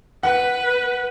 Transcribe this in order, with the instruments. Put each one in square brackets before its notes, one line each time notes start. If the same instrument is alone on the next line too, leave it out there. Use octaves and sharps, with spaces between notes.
[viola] B4 [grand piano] F#5